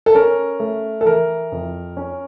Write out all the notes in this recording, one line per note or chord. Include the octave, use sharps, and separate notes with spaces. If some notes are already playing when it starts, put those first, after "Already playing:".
A4
C#4 A#4
A3
A4
E3 A#4
F2
C#4